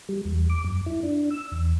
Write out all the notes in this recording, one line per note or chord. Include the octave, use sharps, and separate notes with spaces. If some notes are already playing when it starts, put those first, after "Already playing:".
G3
E2
D6
F#2
E4
D4
E6
E2